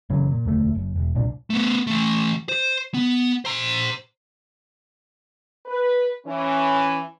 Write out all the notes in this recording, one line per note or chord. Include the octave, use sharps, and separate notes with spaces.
F#1 C#3 E3 F#3
A#2
E1 D2 C3 A3
F#1
E1
D#1 C2 A#2 D4
A3 B3
E3 A3
C5
B3
C5 A#5
B4
E3 C#4